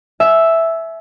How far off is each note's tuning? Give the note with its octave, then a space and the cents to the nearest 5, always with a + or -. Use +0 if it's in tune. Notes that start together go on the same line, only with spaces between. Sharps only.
E5 +0 G#5 +35